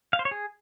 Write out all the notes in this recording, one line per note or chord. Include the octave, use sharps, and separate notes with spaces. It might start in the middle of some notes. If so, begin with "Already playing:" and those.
F5
C5
C#5
G#4